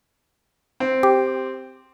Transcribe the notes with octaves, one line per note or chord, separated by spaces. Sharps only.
C4
G4